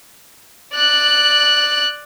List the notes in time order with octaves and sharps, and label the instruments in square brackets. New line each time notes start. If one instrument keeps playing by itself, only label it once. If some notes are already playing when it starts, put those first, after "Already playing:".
[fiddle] D5 F#6